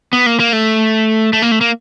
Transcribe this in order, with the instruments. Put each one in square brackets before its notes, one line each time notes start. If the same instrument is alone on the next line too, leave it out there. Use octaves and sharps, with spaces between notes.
[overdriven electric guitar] B3
A#3
A#3
A3
A3
A#3
A3
A#3